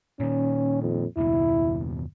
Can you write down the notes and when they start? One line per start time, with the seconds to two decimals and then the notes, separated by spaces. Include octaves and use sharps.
0.20 A#2 D#3 C#4
0.82 F2
1.17 F#1 D#2 B2 E4